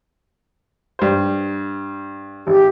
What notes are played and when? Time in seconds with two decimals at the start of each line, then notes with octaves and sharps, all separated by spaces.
0.99 G2 C5
2.47 G#1 G4